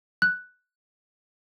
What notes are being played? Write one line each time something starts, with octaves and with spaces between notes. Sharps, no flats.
F#6